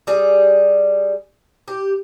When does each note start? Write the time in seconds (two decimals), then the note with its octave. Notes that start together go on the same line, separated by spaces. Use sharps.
0.07 G3 G#4
1.68 G4